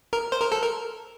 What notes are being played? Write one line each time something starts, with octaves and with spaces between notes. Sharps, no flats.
A#4
C5
A#4
A4
A#4